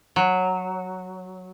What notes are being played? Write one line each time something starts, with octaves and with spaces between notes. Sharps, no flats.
F#3